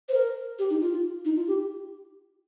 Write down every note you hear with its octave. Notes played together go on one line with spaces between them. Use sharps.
C5
A#4
G4
D#4
F4
D#4
F4
G4